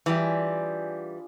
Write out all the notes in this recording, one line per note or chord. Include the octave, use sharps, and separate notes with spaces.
E3 G3 D4 F4 G4 G#4